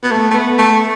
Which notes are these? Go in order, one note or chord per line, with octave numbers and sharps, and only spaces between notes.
B3
A3
A3
B3
A3